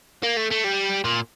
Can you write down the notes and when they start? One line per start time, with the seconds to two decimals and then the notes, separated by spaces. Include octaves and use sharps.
0.23 A#3
0.36 A3
0.51 A3
0.64 G3
1.05 A#2